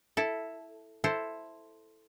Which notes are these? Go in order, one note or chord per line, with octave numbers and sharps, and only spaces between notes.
E4 A4
E4 A4 C5